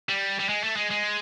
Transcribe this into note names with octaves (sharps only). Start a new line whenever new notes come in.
G3
G3
G#3
A3
G#3
G#3